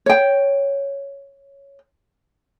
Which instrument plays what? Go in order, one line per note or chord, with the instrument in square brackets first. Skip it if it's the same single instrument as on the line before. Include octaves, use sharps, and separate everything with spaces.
[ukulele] C#5 G5